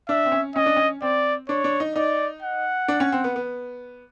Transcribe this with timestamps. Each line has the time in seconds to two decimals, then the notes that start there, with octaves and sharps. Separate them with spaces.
0.09 D4 E5
0.25 C4
0.32 C#4
0.56 C#4 D#5
0.66 D4
0.76 C#4
1.02 C4 D5
1.49 D4 C#5
1.64 D4
1.80 D#4
1.96 D#4 D5
2.42 F#5
2.88 D4
3.00 C#4
3.12 C4
3.24 B3
3.36 B3